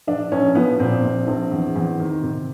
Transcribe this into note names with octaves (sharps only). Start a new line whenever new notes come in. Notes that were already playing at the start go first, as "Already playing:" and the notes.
A#1 D4
A#1 C#4
F3 B3
A#2 C4
A#1
A#1
E2
E2
D#3
C3